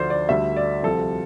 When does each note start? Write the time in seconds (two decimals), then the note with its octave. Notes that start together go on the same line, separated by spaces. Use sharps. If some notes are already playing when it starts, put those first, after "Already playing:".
Already playing: D2 D3 F3 A3 C5 D5
0.10 D5
0.29 D2 D3 G3 E5
0.56 D5
0.83 C2 C3 F3 A4